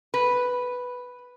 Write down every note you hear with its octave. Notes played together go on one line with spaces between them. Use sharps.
B4